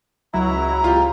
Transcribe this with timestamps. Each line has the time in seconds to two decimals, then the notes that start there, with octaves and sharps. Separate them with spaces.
0.34 C#2 F#3 E4 A#5
0.84 C#2 F4 G4